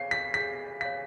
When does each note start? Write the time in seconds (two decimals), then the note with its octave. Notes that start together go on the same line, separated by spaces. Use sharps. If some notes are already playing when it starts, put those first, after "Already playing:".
Already playing: G#4 C#5 F5 C7
0.11 B6
0.34 G#4 B6
0.81 C#5 F5 B6